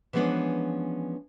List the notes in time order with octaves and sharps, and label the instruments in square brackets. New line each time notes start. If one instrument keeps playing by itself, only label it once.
[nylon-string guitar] E3 F3 G#3 B3 C#4 D4